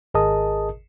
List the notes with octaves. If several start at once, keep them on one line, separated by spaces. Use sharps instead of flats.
G#1 G#4 A#4 D#5 A5 D#6